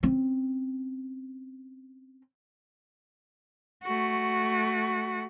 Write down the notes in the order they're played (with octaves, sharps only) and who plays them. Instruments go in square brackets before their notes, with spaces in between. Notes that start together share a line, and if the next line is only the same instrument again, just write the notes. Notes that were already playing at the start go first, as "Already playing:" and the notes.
[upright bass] C4 C#4
[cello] A3 F#4